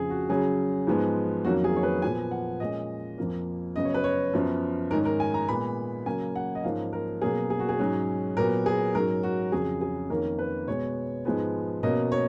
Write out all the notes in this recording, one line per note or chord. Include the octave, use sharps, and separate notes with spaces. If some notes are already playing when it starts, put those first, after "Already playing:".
Already playing: F2 C#3 F3 G#4
F#4
C#3 F#3 C#4 G#4
G#2 F3 G#3 B3
F2 D#3 F#3 A#3 C#4 F#4
G#4
C#5
B4
A#2 F3 B3 G#5
F#5
A#2 G#3 C#4 D#5
F2 F3 A#3
F#2 C#3 F#3 B3 D#5
C#5
B4
C#5
F#2 F3 B3
G#2 D#3 G#3 C#4 A#4
A#4
G#5
A#5
A#2 G#3 B3 B5
C#3 F#3 A#3 C#4 G#5
F#5
D#5
G#2 F3 A#3 C#4 F5
A#4
B2 F#3 A#3 C#4 G#4
G#4
F#4
G#4
G#2 F#3 C#4
A#2 F#3 B3 A#4
G#4
G#2 F#3 C#4 A#4
F#4
F2 C#3 F#3 G#4
G#4
F2 D#3 A#3 C#4 A#4
B4
B2 G#3 B3 C#5
G#2 F3 G#3 B3
B2 A#3 C#4 D#5
C#5